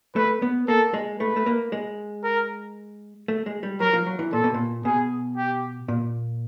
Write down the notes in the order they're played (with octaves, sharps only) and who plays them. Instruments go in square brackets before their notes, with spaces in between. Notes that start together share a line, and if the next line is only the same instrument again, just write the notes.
[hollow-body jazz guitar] A3 [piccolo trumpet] B4
[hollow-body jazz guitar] B3
[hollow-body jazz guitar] A#3 [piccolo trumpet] A4
[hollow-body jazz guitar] G#3
[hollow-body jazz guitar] A3 [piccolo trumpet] B4
[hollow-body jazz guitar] A3
A#3
G#3
[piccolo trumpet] A#4
[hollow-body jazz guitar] A3
G#3
G3
[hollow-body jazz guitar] F#3 [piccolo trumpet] A#4
[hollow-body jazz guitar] F3
F#3
E3
[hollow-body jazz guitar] A#2 [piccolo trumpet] A4
[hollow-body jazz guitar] B2
A#2
[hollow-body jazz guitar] B2 [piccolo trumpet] G#4
[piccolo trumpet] G4
[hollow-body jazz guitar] A#2